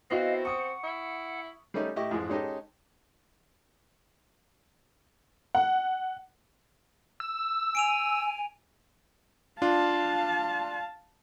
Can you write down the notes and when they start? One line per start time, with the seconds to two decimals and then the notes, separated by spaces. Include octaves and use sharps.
0.11 B3 C4 E4 F#4 D#5 F5
0.45 F#5 C#6 D#6 C#7
0.83 E4
1.74 G3 A3 C#4 D#4 D#5
1.96 A2 E4 G4 D#5 C#6
2.11 F2 G#2 E3 G#3
2.29 G#3 C#4 D#4 G4 A4 D#5
5.55 F#5
7.20 E6
7.75 G#5 D7 D#7 F7
9.62 D4 F4 F5 A5